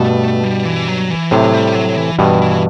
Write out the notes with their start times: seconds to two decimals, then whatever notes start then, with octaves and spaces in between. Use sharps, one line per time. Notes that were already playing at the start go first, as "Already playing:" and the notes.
Already playing: G2 B2 A3
0.44 G3
0.65 E3
0.88 F#3
1.10 E3
1.31 A2 C3 F#3
1.53 G3
1.75 F#3
1.97 E3
2.19 G2 B2 E3
2.42 E3